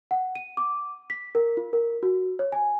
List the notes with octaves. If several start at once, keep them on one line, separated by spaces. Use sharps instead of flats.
F#5
D#7
D6
B6
A#4
F4
A#4
F#4
C#5
G#5